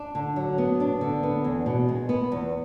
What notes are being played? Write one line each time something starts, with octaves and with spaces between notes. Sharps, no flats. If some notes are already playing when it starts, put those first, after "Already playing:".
Already playing: D4
D3
F#3
B3
D4
D3
B3
E2
B2
G#3
B3
E2